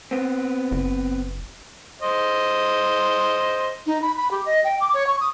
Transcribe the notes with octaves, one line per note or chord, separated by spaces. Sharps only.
B3 C4
F#1
C5 D#5
D#4
B5
B5
G4
D#5
G5
D6
C#5
C#6
D#6